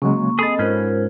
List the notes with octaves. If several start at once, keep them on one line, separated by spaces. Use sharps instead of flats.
C#3 F#3 G#3 A#3 C#6
C4 G#4 A4 D#5 B5 A6
G#2 C#4 F4 A#4 C5